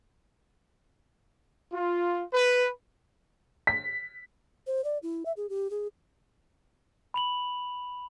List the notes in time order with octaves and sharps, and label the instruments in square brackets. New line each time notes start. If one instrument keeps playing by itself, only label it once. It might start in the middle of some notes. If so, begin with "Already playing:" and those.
[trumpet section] F4
B4
[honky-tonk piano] B6
[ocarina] C5
D5
E4
E5
G#4
G4
G#4
[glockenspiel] B5 F7 F#7